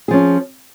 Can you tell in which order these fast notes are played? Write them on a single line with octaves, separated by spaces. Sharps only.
G#4 F3 C#4